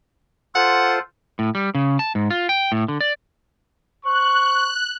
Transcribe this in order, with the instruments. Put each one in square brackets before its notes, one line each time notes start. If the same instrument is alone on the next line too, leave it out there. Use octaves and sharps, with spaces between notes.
[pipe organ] F4 A4 C5 [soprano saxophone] F#5
[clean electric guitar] A2
G3
C#3
A5
G#2
F4
G5
A2
D3
D5
[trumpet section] C5 C#6 [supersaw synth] F#6